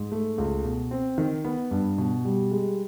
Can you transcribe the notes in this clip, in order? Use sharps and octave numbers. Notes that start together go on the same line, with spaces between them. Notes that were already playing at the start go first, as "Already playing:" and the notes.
Already playing: G#2
A3
C#2
B2
C4
D#3
B3
G2
B2
G3
G#3